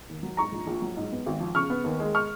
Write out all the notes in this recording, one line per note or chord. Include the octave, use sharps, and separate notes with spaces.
D#2
F#3
G#2 A#5 C#6
A#1
A#1
F#3
G#2
B3
G#1
F3
C#3 C#6 F6
B3
D#2
G#3
C#6 F6